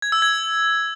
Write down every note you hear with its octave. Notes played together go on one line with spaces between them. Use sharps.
G#6
E6
G#6